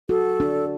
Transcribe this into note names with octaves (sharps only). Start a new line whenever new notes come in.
F#4 A4
D4